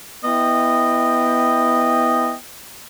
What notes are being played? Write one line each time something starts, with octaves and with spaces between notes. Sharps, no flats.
B3 E4 D#5 G5